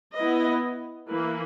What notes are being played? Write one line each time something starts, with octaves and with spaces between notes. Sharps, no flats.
B3 E4 B4 D#5
E3 A#3 E4 B4